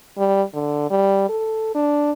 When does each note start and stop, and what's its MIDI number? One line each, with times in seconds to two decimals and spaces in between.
0.18 0.43 55
0.54 0.89 50
0.90 1.27 55
1.29 1.71 69
1.75 2.11 62